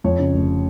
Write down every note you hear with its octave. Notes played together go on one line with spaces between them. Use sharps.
F2 C#5
C#3
F1